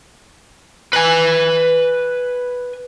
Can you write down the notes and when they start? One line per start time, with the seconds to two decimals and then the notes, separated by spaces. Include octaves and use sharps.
0.93 B4 G#5